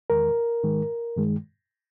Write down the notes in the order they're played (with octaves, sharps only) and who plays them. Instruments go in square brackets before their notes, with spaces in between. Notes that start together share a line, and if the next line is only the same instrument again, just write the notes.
[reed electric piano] E2 D#3 G#3 A#4
G#2 D#3 G#3
G2 D#3 G#3